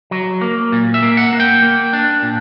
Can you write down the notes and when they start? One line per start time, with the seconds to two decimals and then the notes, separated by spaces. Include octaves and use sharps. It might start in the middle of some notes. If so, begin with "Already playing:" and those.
0.11 F#3
0.41 A#3
0.72 A#2
0.94 E5
1.02 A#3
1.17 F#5
1.33 A#3
1.40 G5
1.62 A#3
1.93 D4
2.22 A#2